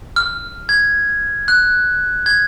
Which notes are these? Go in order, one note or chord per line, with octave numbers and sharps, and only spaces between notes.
F6
G#6
F#6
G#6